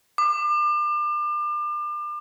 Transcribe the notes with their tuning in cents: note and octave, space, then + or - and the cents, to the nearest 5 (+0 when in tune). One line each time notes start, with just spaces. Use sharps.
D6 +35